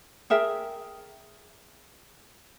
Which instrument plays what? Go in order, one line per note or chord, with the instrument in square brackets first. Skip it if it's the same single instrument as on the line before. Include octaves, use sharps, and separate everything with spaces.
[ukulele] G#4 A#4 E5 G5